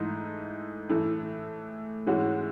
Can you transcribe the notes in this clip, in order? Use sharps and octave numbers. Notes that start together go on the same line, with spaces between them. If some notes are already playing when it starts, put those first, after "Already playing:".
Already playing: G#2 E3 A3 D#4
A2 E3 A3
G#2 E3 G#3 C#4 F#4